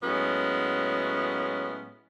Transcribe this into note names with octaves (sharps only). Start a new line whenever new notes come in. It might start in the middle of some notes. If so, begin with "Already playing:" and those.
A2 F#3 G#3 B3 C#4